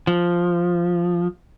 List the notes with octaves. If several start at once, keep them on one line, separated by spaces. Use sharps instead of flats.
F3